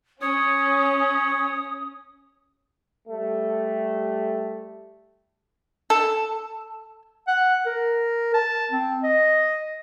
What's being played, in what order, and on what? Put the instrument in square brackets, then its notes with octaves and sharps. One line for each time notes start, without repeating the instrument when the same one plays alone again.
[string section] C#4 [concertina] C#5 [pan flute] D#6
[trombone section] G3 A3
[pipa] A4
[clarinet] F#5
A#4
A5
C4
D#5